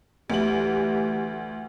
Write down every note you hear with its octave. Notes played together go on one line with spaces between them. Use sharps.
D2 E3 G4 F#7